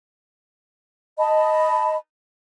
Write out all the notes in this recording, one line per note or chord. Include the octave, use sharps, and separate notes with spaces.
D#5 A5 B5